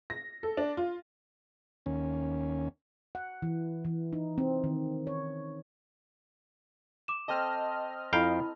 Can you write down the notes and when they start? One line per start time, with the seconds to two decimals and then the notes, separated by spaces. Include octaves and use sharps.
0.10 A#6
0.43 A4
0.57 D4
0.77 F4
1.86 D#2 C#4
3.15 F#5
3.42 E3
3.85 E3
4.13 D#4
4.38 C4
4.64 D#3
5.07 C#5
7.08 D6 E7
7.28 C4 A4 D#5 F6
8.13 F2 E4 F5 G5 A#5 B5